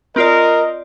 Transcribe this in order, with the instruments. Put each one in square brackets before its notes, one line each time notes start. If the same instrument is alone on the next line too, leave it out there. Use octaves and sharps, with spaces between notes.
[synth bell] C4 F4 D5 [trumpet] A#4 [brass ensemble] D#5